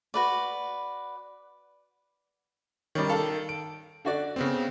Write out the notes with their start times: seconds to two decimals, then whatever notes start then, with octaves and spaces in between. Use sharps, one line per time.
0.14 F#4 B4 D5
2.95 D#3 G3 C#4
3.09 A4 F5
3.49 D7
4.05 D3 F#4 D5
4.36 C#3 B3 C4